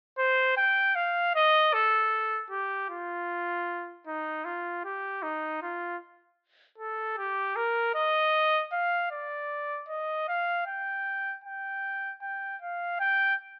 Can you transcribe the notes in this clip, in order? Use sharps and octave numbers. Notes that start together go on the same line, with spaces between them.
C5
G5
F5
D#5
A4
G4
F4
D#4
F4
G4
D#4
F4
A4
G4
A#4
D#5
F5
D5
D#5
F5
G5
G5
G5
F5
G5